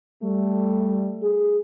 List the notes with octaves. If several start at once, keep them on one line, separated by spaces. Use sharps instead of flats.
G3 A3
G#4